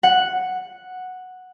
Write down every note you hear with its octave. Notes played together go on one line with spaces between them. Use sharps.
F#5